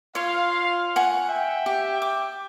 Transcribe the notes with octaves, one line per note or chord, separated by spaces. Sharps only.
F4 C#5 F5 C6
F#5 G#5 C#6
E5 G5
G4
D6